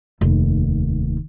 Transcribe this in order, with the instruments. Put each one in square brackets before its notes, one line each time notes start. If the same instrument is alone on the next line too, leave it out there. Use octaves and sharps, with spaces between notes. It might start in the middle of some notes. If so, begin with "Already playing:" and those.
[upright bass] F1 D#2